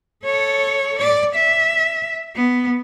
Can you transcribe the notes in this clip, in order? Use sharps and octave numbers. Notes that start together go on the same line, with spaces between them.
A4 C#5
D5
E5
B3